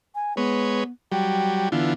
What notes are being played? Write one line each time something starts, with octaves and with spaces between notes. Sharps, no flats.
G#5
G#3 B3 B4 C#5
F#3 G3 G5
D3 E3 B3 F4